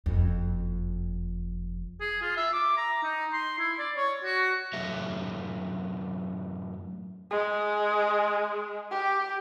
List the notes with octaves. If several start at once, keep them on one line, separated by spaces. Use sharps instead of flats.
F#1 F2
G#4
F4
E5
D6
A#5
D#4
C6
E4
D5
C#5
F#4
F#2 A2 F#3 G4 A4 E5
G#3
G4